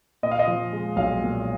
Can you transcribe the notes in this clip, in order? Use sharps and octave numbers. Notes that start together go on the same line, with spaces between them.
A#2 D#5
F5
D#5
F3
G#3
B1 F5
A#2